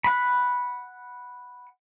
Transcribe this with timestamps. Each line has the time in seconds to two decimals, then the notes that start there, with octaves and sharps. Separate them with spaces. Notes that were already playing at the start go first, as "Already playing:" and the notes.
0.04 F#5 B5